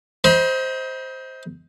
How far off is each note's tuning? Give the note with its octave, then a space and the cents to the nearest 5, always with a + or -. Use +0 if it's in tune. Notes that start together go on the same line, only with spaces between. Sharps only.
C5 +0 D#5 +35 B5 -40